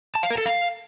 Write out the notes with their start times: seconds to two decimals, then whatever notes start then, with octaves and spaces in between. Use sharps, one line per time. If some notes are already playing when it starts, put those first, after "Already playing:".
0.15 A5
0.23 F5
0.30 A#4
0.38 A4
0.46 F5